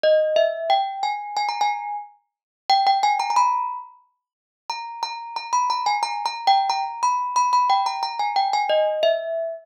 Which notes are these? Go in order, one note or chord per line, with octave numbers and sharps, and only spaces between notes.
D#5
E5
G5
G#5
G#5
A#5
G#5
G5
G5
G#5
A#5
A#5
B5
A#5
A#5
A#5
B5
A#5
G#5
A#5
A#5
G5
A#5
B5
B5
B5
G5
A#5
A#5
G#5
G5
G#5
D#5
E5